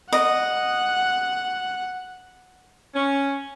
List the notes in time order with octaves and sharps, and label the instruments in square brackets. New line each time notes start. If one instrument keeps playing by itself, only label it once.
[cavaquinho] D#5 [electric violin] F#5
[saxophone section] C#4